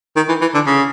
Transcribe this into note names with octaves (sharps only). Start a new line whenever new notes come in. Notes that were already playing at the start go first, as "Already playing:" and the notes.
D#3
E3
E3
D3
C#3